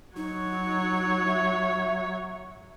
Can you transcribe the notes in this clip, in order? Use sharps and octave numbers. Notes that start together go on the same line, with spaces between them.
F#3 D#4 C#5
E5